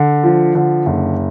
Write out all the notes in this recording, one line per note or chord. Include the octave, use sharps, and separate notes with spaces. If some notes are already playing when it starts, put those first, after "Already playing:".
Already playing: D3
F3
D3
F#1